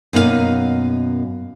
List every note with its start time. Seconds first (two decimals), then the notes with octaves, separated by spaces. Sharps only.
0.13 F#2 B2 A#3 D#4 A4 F5